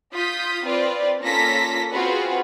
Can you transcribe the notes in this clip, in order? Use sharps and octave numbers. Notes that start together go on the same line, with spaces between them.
F4 D#6 G6 B6
C4 F4 B4 D5
A#3 C#4 F4 A4 A#6 B6
C4 F4 F#4 G#4 B4